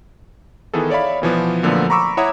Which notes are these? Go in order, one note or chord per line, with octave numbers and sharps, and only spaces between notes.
D#3 E3 B3 G#4 A4
C#5 D5 E5 F5 B5
B2 E3 F3 B3
A#2 D3 F3 F#3 A3 B3
A#5 B5 C#6 D6 E6
E4 C#5 E5 F#5 A#5 D#6